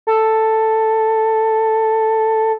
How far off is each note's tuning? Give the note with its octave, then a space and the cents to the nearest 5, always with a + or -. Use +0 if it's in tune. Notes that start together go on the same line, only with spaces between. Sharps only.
A4 +5